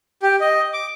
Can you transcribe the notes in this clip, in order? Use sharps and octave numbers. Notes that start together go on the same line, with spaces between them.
G4
D#5
D6